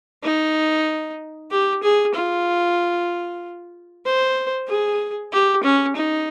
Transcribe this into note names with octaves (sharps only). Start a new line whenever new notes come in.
D#4
G4
G#4
F4
C5
G#4
G4
C#4
D#4